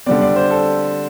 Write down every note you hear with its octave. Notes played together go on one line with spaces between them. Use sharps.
D3 G3 C4 D5
D5
C5
A4